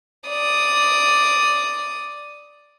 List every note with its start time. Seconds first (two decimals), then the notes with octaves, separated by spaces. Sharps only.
0.28 D5 D#6